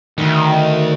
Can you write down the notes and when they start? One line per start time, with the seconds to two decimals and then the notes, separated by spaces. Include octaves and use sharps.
0.18 D2 D#3